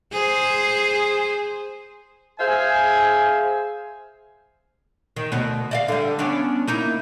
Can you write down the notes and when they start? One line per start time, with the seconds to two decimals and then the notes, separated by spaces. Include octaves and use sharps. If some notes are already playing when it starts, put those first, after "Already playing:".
0.13 G#4 C5
2.40 G#4 C5 E5 F5 G#5
5.16 D#3
5.32 D2 B2 B3
5.71 D5 D#5 F5
5.88 D3 G3
6.19 B3 C#4 D4
6.67 A#3 D#4 E4